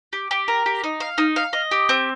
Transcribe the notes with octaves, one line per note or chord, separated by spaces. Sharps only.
G4
G4
A#4
G4
D#4
F5
D#4
F5
D#5
G4
C4